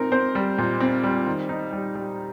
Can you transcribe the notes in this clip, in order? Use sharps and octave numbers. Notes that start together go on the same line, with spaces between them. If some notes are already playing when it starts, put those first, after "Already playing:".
Already playing: A#2 C4 D#4 A#4
C4 C5
G3
A#2
C4
G3
D#3
D#4
G3
G3